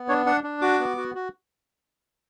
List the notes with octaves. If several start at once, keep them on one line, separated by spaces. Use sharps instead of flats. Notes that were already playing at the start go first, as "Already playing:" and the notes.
Already playing: B3
D4 C#5
D4 F#5
D4
F#4 D6
B3
F#4
F#4